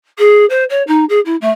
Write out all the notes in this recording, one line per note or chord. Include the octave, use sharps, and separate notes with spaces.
G#4
C5
C#5
D#4
G#4
E4
A3